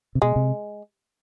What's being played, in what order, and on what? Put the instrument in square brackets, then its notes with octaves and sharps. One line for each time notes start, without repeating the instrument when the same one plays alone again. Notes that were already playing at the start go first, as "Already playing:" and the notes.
[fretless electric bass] C3
[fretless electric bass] B2 [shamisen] G#3
[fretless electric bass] C3